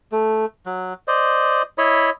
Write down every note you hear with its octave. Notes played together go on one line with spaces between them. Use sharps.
A3
F#3
C5 D5 D#5
E4 C#5 D#5 B5